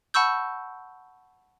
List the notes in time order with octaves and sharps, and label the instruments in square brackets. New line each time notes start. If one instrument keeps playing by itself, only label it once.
[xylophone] F#5 A5 B5 C#6 E6 G6